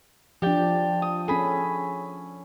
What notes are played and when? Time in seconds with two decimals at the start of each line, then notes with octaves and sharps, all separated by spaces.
0.42 F3 D4 G4 D5 G5
1.02 D#6
1.28 C#4 G#4 A4 B5